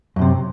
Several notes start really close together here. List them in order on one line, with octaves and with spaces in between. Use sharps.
F#2 A2 C3